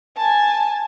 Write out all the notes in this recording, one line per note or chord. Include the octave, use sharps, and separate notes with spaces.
G#5 A5